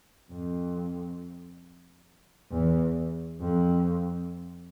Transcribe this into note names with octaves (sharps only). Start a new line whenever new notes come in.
F2
E2
F2